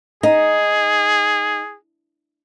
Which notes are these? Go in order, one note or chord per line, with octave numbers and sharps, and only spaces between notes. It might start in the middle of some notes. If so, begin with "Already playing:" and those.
D#4 G#4